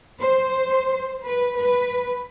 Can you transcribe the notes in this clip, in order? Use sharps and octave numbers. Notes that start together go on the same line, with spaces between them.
C5
B4
B4